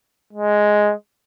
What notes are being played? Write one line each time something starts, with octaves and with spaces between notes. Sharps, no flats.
G#3